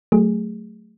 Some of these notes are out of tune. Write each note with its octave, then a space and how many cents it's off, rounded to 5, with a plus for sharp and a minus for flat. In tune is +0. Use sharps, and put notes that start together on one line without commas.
F#3 +10 A3 +0 G#4 -20